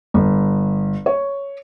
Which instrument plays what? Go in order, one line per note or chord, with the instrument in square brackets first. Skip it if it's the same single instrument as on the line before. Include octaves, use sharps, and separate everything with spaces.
[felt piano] G1
C#5